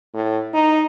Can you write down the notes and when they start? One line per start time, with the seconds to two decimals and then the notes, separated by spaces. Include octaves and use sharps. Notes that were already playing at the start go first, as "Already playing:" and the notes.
0.14 A2
0.54 D#4